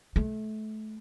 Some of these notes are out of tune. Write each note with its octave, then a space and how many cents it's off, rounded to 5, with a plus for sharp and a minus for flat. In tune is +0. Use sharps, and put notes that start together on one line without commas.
A3 -30